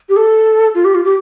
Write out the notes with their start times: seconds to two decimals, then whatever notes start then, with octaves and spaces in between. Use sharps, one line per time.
0.09 G4
0.17 A4
0.75 F4
0.85 G4
0.95 F4
1.04 G4